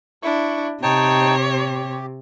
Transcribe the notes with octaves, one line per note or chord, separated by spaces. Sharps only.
D4 E4 C#6
C3 D#4 C#5 G5 A5
G4